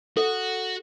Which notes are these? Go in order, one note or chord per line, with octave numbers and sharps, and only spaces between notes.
F#4 A4